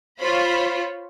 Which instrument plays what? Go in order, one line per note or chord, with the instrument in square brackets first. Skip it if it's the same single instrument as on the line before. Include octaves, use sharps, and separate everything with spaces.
[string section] F4 C5 C#5 B5